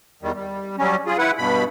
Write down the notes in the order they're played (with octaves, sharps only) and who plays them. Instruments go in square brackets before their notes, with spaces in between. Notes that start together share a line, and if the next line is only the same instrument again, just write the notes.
[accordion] E2 D#3 G3
G3
F#3 G3 C#4
F4 G#4
E4 B4 F#5
G2 B2 B5